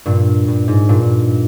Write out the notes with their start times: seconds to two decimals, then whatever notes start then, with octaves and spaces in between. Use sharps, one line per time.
0.06 G2 A#2
0.48 G2
0.68 G#2
0.89 G2 A#2